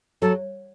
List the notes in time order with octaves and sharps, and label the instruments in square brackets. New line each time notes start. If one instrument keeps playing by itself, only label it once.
[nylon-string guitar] F#3 [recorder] A4